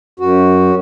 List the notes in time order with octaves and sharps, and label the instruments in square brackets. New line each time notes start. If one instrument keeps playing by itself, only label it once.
[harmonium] F#2 F#4